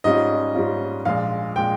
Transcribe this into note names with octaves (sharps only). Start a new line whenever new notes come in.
G#2 G3 C#4 F4 D#5
G#2 G3 C#4 F4
A#1 A#2 G#3 F5
A#2 G#3 G5